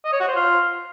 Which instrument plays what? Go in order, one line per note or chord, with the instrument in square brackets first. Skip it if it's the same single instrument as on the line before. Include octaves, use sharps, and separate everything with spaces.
[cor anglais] D#5
C#5
F#4
C5
F4